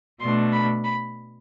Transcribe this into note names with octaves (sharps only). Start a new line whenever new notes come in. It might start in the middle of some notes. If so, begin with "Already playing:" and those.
B2 A3 D4 C6
B5
B5